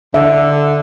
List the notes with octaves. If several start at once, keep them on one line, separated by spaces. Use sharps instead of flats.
D3 E5